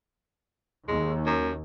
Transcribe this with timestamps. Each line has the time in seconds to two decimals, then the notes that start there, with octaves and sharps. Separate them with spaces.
0.88 D#2 G#3
1.26 F#2